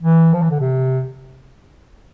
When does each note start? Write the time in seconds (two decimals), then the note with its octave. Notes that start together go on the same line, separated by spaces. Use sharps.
0.02 E3
0.33 F3
0.42 E3
0.51 D3
0.60 C3